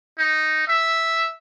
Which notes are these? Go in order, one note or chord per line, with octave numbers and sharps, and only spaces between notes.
D#4
E5